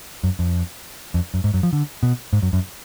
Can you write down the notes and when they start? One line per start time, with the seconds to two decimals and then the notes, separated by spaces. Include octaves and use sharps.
0.24 F#2
0.39 F2
1.14 F2
1.34 F#2
1.44 G#2
1.54 F#2
1.63 F3
1.73 D3
2.03 B2
2.33 G#2
2.42 F#2
2.53 F#2